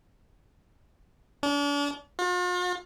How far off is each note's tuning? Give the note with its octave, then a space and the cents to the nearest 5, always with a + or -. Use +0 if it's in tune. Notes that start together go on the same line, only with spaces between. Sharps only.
D4 -40
F4 +45